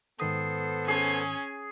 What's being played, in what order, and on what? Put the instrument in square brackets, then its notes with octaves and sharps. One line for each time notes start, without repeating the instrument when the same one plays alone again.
[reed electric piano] G#2 D#3 D#6 [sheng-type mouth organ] B3 A4 C5 [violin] C7
[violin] C#4 [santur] G#4